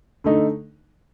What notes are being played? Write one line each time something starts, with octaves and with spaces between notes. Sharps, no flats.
D3 A3 D#4